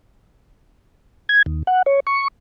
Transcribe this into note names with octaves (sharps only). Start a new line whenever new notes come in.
G#6
D#2
F#5
C#5
C#6